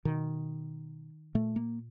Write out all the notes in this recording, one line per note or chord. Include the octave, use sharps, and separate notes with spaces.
B2 D#3
A#2 A3
A#3